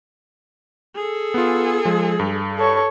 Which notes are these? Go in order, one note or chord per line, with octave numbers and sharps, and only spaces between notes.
G#4 A4
B3 F4
F3 G#3
G2
A4 C#5